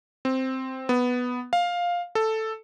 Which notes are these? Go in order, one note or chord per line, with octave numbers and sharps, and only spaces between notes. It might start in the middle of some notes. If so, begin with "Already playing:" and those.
C4
B3
F5
A4